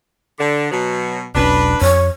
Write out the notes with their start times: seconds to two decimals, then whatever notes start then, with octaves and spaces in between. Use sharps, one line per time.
0.39 D3
0.71 B2 F#3
1.35 E1 B1 C#4 D4 B4
1.81 F2 C#5